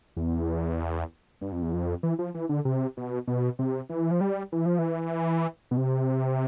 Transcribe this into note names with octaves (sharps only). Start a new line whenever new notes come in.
E2
G2
F2
E2
F2
E3
F3
E3
D3
C3
B2
B2
C3
E3
F3
G3
E3
F3
E3
B2
C3